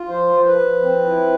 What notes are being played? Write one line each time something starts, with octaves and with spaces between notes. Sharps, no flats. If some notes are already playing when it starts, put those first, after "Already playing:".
Already playing: F4
F3 C5
F3
B4
F3
C4
E4